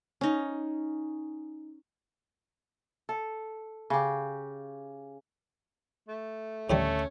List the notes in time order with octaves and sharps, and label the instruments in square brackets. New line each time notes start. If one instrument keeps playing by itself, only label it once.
[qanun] C#4 D#4
[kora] A4
C#3 G4
[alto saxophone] A3
[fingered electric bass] D2 [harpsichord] A2 D#3 G3 [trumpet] A3 [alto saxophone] C#4